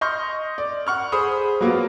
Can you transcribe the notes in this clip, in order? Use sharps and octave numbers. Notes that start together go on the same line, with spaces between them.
D#5 C6 C#6 F6 G6
D5
F#5 C#6 F6
G#4 C5 B5 D#6
F#3 A#3 B3 F4